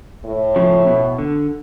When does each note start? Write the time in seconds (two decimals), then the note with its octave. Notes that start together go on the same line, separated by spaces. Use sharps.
0.25 A2
0.56 C#3 F3
0.87 B2
1.18 D3